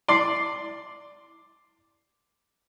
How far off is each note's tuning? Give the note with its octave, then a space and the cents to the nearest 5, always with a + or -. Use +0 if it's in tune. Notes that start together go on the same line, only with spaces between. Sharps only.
D5 +0 C6 +0